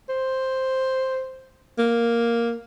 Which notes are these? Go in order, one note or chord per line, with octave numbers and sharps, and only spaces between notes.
C5
A#3